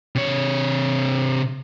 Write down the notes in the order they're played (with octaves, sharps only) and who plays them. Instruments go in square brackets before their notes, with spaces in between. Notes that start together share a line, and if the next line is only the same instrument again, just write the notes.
[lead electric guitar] C3 C#5